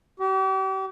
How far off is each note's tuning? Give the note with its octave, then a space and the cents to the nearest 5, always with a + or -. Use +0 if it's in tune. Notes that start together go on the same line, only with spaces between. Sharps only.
G4 -40